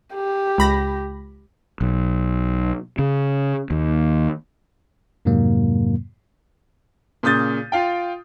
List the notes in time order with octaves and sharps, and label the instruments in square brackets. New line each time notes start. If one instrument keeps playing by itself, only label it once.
[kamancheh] G4
[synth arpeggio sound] C#2 B5 A#6
[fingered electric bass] B1
C#3
D#2
[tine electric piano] F2 G#2 C3 F#3 A#3
[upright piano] A#2 C#3 D#6 G6 A6
F4 F5 G5